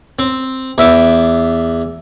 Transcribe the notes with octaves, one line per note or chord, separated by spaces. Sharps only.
C4
E2 E5 D6